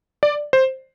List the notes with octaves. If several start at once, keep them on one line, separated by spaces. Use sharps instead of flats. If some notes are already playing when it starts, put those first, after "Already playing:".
D5
C5